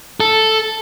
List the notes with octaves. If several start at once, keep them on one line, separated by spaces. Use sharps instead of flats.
A4